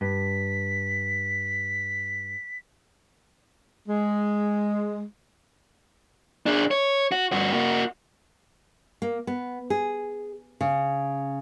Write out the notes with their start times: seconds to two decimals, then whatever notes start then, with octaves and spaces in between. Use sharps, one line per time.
0.01 G2 B6
3.88 G#3
6.46 D4 G#4
6.71 C#5
7.12 F#4
7.32 G2 F#4
7.53 A#3 F#4
9.02 A#3
9.27 B3
9.70 G#4
10.61 C#3